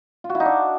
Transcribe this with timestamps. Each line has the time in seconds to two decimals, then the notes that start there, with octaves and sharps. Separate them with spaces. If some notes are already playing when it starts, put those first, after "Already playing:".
0.24 F4
0.29 F#4
0.35 E4
0.40 D#4
0.45 D4